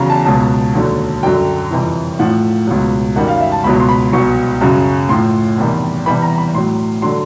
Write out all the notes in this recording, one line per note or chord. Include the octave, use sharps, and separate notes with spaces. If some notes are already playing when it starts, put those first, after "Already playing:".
Already playing: E2 C#3 F#3 A#5 B5
A5
C#2 B2 F#3 A5
D#2 D3 F#3
F#2 D3 F#3 G5
F2 C3 E3 G3
A2 F3 F#5
C#2 B2 F#3
F#2 D#3 G3 F#5
F5
E5
A5
C#2 B2 F#3 B5
C6
B5
C2 B2 F#3 C#6
F#2 C#3 F#3
A2 F3 C6
E2 C3 D#3 G3
E2 C3 E3 G3 B5
A#5
B5
A2 F#3 C6
D3 F#3 C6